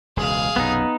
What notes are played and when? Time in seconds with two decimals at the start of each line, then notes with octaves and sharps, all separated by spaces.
0.17 E1 C#2 G#4 F5
0.56 B1 F#2 C3 B3 D#4